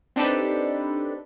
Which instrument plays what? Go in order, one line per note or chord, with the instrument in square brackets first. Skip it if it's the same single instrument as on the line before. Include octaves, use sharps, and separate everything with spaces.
[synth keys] C4 D4 D#4 G4 A4 B4